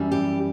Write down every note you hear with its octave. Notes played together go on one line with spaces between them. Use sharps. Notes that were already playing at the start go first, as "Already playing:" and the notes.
Already playing: F#2 E3 G3
G4